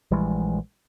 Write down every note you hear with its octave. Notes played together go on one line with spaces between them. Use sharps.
A#1 E3 G3 G#3